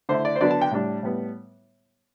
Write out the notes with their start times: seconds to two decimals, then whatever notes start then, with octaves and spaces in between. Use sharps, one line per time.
0.09 D3 A3 E4 C5
0.25 D5
0.36 C5
0.41 D3 F#3 B3 D4 D5
0.51 A5
0.62 G5
0.71 A2 G3 D4
1.03 A2 G3 B3